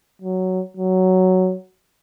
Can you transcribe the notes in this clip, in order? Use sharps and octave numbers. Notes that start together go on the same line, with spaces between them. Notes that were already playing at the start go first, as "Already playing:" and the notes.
F#3
F#3